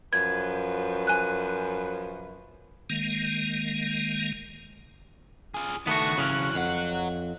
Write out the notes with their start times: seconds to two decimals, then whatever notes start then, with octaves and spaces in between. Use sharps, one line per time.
0.13 F#2 F3 B4 G#6
1.07 G#5 F#6
2.90 D#3 G#3 A#3
5.54 F4 G#4
5.87 D#3 A3 B3 D4 F#4
6.18 C#3 E3 F#3 C#4 F#6
6.55 F2 C#5 F#5